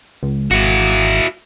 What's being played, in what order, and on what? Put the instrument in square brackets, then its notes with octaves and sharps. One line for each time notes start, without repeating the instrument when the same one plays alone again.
[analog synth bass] C#2
[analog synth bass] G#1 [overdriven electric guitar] E4 F#4